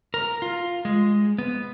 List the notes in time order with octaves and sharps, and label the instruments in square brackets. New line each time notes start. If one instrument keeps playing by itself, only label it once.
[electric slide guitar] A#4
F4
G#3
B3